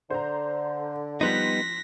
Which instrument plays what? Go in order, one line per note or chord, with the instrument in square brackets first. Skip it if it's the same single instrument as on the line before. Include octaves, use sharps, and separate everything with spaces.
[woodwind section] D3 [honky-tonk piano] C5 A#5
[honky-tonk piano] F3 C6 F#6 [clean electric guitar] G3 B3 D#4 [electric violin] A#6 B6